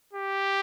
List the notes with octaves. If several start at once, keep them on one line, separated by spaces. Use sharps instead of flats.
G4